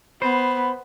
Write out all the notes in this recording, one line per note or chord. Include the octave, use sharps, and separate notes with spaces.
B3 C5 B5